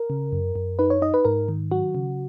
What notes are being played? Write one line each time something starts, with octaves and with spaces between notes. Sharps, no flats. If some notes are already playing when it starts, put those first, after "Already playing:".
Already playing: A#4
C#3
F#2
F#2
D#4 B4
C#5
D#4 D#5
B4
G#2 A#4
D#3
F#3 F#4
C#3